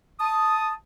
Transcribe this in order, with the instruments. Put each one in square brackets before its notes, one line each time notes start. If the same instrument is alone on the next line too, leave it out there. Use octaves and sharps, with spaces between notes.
[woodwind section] A5 D#6